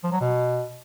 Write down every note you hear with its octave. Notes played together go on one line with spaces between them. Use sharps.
F3
F#3
B2